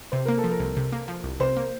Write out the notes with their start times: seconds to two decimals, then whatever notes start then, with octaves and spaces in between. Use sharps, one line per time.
0.12 C3 C5
0.25 A#3 A#4
0.38 A4
0.44 F3
0.51 A#4
0.60 C2
0.77 C3
0.92 A#3
1.08 F3
1.24 C2
1.40 C3 C5
1.57 A#3